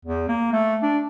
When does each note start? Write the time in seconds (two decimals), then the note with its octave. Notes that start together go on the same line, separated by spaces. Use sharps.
0.05 E2
0.29 A#3
0.52 A3
0.82 D4